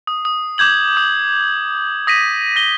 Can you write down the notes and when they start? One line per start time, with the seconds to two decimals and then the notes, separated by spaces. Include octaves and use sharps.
0.07 D#6
0.25 D#6
0.58 D6 G6 G#6 F#7
0.97 D#6
2.07 D#6 A#6 B6 D#7
2.56 A#6 G7